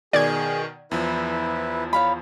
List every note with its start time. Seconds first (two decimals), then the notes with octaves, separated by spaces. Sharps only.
0.13 B2 D#3 G#4 D5 G#6
0.91 E2 F3 E4 B4
1.93 C#5 F5 B5